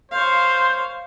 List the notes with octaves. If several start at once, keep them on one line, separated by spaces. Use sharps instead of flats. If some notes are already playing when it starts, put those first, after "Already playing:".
C5 C#5 F5